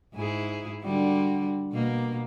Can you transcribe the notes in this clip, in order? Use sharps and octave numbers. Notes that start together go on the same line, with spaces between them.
G#2 E4 G#4
D3 G3 F#4
B2 A#3